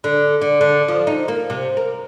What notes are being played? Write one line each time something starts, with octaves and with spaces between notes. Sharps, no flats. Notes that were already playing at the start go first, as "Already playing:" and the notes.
D3
D3
D3
F3
D#4
A#3
C3
A#4